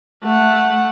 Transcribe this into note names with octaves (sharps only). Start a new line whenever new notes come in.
A3 F#5